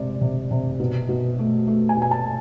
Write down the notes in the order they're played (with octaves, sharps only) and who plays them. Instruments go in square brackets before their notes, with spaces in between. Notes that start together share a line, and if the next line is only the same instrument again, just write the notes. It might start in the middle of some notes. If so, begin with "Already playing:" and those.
Already playing: [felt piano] C3 G#3 D5
C3
C3
B2
B2
A3
A3
G#5
B2
G#5
A5